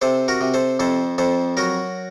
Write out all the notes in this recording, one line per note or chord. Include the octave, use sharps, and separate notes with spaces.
C3 A4 C5
F#4 A#4
C3
A4 C5
F2 A4 C5
F2 A4 C5
F#3 F#4 A#4